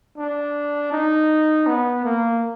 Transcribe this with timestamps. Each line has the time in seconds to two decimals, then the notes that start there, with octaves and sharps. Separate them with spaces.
0.18 D4
0.92 D#4
1.67 B3
2.05 A#3